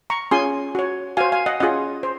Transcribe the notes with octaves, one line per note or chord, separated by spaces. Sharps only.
A#5 C#6
C#4 F4 G#4 G#5 C6
F#4 C#5
F#4 C5 F5 G#5
F5 G#5
D#5 F#5
C#4 F4 G#4 D#5 F#5
C5